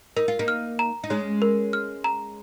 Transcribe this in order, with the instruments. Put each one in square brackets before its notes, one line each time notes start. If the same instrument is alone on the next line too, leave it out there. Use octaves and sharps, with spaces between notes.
[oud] D#4 [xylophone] A#4
[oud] F4
A#3 D#4
[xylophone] F6
A#5
[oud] D#4
[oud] G#3 C#4 [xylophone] C#5
[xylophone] A#4
F6
A#5